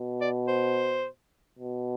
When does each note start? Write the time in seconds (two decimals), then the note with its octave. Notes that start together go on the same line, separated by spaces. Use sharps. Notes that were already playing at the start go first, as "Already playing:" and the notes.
Already playing: B2
0.21 D5
0.48 C5
1.59 B2